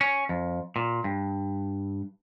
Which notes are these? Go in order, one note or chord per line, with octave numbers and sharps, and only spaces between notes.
C#4
F2
A#2
G2